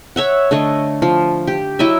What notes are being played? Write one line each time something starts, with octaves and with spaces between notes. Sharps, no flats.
C#5 E5 F#5
D3 A3 C#5 D#5
F3
G4
F#3 E4 D#5 E5